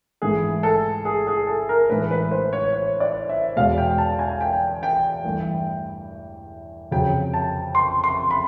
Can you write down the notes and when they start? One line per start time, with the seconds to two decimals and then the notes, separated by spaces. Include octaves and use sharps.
0.22 G#2 E3 A3 G#4
0.63 A4
1.05 G#4
1.27 G#4
1.47 A4
1.69 A#4
1.90 A2 E3 G#3 B4
2.11 B4
2.31 C5
2.53 C#5
2.73 C#5
3.00 D5
3.29 E5
3.56 E2 B2 G#3 F5
3.78 G5
3.98 A5
4.19 G#5
4.41 G5
4.83 G5
5.24 G2 E3 A3
6.91 F2 C#3 F#3 G5
7.34 A5
7.75 C6
8.04 C6
8.31 B5